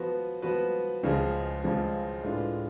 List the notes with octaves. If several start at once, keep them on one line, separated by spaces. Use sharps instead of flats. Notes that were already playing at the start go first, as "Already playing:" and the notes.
Already playing: F3 B3 F#4 B4
F3 B3 F#4 B4
C#2 C#3 F3 G#3
C#2 C#3 F3 G#3
A2 G#3 D4 F4 B4